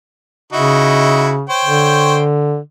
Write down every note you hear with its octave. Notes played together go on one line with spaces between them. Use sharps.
C#3 D#4 E4 F#4
C5 C#5 G5
D3